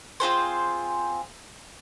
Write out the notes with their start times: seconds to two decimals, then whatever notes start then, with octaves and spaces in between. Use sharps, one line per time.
0.20 C4 F4 G#4 C5